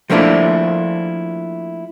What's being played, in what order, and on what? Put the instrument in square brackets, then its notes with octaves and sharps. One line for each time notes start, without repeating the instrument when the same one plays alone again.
[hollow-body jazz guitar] F3 A3 A#3 D4 E4 F4